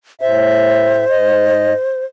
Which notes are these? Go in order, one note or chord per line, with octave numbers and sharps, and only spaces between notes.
A2 C5 E5
G#2 D#5